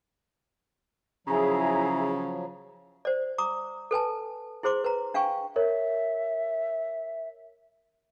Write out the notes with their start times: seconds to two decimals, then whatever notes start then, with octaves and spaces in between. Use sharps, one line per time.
1.27 C#3 F3 F#3 E4 G#4 A#5
3.05 C5 D5
3.38 A#5 D6 D#6
3.91 A4 B4 G#5 A5
4.63 E4 G#4 C5 C6 D6
4.84 B4 A#5
5.14 D4 F5 G5 G#5 C#6
5.56 A#4 C#5 E5